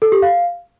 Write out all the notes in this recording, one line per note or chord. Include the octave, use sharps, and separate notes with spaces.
A4
G4
F5